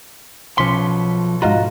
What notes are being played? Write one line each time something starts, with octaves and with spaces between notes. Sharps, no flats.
B1 F3 C#4 C6 C#6 B6 C#7
G#2 F4 F#4 D#5 F5 A#5